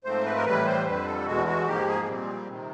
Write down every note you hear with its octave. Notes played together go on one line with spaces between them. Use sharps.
G#2 F3 A3 C4 C5
B4
A#4
A2 E3 G3 B4
C5
F2 D3 G3 B4
A4
E2 B2 G#3 F#4
F#4
G#2 F3 A#3 G4
G#4
A#2 G3 C4
C3 D#3